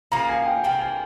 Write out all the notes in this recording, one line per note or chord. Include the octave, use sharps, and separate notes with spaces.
F3 A#3 C#4 G#4 A#5
G#5
G5
C3 F3 A#3 G5
G#5